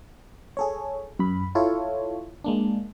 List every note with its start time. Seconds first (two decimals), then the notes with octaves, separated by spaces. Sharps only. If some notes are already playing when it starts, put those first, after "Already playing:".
0.57 G#4 A4 C#5
1.19 F#2 B5
1.55 E4 F4 A4 C#5
2.44 G#3 A#3 D4